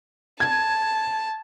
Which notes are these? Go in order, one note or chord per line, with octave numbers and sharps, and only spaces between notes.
A5 G#6